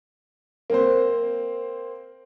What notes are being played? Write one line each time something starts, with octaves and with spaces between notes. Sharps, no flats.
A#3 C4 C5